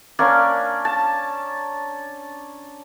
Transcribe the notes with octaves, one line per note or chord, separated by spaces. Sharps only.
A#3 C#4 D4
A5